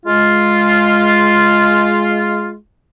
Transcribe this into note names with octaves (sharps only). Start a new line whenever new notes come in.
G#3 F4